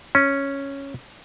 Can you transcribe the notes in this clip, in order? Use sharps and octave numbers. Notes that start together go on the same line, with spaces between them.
C#4